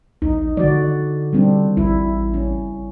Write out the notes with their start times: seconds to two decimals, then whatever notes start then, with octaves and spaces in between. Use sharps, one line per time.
0.22 A#1 D#4
0.57 D3 F#4 D5
1.33 G3 C4 D4
1.77 A1 E4
2.34 C#4